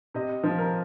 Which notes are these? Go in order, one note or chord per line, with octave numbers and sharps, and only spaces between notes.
C3 D#5
F3
A#4